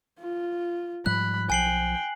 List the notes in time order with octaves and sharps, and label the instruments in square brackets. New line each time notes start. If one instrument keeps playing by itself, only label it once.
[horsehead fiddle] F4
[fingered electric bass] G#2 F3 G3 [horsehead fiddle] B5 [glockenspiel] F#6
[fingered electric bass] B1 F3 [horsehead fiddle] G5 [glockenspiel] G#5 C7 F#7